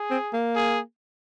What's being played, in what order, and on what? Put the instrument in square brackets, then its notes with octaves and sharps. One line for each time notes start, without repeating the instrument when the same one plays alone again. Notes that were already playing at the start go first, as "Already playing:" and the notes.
Already playing: [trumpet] G#4
[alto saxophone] C4
A#3
[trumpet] G#4